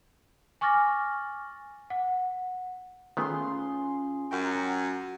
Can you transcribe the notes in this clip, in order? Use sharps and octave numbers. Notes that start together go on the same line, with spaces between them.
G#5 C#6 D6 F6 A6 A#6
F#5
D#3 A3 B3 C#4 F4 G#4 C6
F#2 F#4 G5 A#5